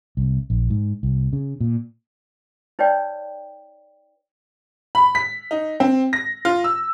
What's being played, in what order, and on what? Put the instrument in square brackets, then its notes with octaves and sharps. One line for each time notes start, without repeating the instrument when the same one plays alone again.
[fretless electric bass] C2
A#1
G#2
C2
C#3
A#2
[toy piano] D#4 B4 C#5 D5 G5
[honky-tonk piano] B5
B6
D#4
C4
A#6
F4
E6